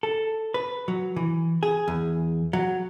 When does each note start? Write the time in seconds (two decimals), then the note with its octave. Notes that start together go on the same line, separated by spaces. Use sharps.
0.03 A4
0.54 B4
0.88 F#3
1.16 E3
1.63 G#4
1.88 E2
2.53 F#3